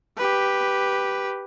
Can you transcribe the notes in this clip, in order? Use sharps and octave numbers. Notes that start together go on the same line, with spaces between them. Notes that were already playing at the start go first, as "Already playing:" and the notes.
G4 B4